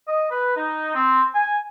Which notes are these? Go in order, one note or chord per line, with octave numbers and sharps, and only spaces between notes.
D#5
B4
D#4
C4
G#5